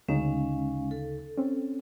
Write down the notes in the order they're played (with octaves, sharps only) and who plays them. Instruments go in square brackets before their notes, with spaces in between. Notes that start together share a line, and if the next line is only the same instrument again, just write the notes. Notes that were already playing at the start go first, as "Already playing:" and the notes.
[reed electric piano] D2 C#3 D#4 [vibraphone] G#3 C#4 F5
[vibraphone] A4
[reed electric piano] C4 C#4